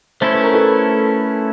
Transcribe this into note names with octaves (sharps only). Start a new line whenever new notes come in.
A3 C#4 E4 C5
B4
A#4
A4 B4